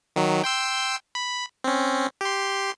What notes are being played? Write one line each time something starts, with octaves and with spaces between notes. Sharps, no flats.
D#3 F#3
G5 C6 E6
B5
C4 C#4
G4 C6